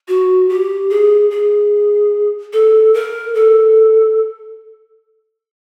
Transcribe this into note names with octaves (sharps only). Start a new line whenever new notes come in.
F#4
G4
G#4
G#4
A4
A#4
A4